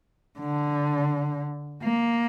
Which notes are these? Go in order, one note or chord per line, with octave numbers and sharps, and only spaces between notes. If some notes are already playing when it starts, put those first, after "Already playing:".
D3
A#3